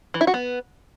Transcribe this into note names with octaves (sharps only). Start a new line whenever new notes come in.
E3
E4
F#4
B3